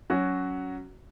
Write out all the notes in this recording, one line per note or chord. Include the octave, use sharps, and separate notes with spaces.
F#3 C#4 F#4